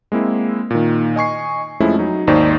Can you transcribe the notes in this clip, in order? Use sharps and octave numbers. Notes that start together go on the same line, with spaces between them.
G#3 A#3 C4 E4
A#2 D#3
D#5 G#5 C#6 C7
F2 F3 G#3 A3 C#4 E4
F#3 D#4
G#1 D#2 D#4 C5 D5 C#6